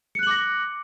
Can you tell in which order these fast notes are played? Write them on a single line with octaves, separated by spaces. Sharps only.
C#7 F#6 F#7 D6 A#6